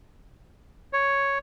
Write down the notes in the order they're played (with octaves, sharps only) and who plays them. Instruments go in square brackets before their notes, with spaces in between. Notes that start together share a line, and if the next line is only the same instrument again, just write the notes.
[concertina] C#5